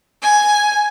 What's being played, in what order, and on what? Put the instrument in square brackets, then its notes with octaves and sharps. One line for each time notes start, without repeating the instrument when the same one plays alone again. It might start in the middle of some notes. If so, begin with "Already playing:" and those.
[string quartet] G#5